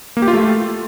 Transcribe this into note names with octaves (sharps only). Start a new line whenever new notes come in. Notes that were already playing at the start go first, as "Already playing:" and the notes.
A#3
G4
F4
A3